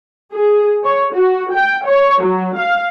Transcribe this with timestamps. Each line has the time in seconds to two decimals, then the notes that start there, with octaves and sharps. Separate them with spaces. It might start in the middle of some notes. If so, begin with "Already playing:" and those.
0.33 G#4
0.84 C#5
1.14 F#4
1.53 G5
1.86 C#5
2.22 F#3
2.58 F5